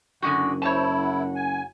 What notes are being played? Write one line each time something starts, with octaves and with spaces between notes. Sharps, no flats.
F#1 D3 G#3 F#4 F#5
E4 C5 C#5 A5
F#5
G#5